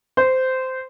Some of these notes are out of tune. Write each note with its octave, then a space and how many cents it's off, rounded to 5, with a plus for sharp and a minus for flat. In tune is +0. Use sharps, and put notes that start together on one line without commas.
C5 -15